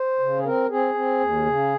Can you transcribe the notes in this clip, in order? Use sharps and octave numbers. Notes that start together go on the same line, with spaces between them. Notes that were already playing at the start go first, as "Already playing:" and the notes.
Already playing: C5
C#3
G#4
C4 A#4
C4 G#4
C4
D#2
C#3